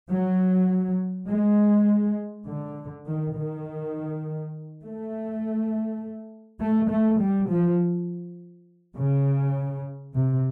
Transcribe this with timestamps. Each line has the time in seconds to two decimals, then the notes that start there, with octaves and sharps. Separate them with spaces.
0.10 F#3
1.28 G#3
2.47 D3
3.06 D#3
3.35 D#3
4.83 A3
6.60 A3
6.90 A3
7.20 G3
7.49 F3
8.97 C#3
10.15 C3